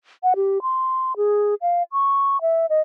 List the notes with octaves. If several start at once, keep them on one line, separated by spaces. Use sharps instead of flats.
F#5
G4
C6
G#4
F5
C#6
E5
D#5